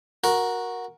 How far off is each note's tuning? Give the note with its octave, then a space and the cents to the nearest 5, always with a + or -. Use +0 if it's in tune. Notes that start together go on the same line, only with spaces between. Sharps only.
F#4 -10 A#4 +10